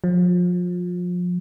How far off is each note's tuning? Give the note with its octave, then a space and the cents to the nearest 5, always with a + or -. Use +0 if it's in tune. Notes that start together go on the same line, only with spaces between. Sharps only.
F3 +30